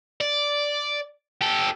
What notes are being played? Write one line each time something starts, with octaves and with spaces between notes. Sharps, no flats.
D5
G4 A4